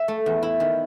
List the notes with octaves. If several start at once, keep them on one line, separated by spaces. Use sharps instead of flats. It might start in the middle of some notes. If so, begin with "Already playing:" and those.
Already playing: E5
A3
E2
E4
D#3